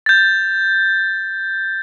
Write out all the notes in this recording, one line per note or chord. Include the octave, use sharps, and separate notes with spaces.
G6 A6